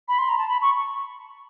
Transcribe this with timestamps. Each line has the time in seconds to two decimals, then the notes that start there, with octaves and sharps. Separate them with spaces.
0.08 B5
0.19 C6
0.29 A#5
0.38 A5
0.48 B5
0.62 C#6